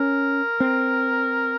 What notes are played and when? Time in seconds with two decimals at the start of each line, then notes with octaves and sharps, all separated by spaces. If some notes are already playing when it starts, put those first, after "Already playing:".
Already playing: C#4 A#4
0.60 C4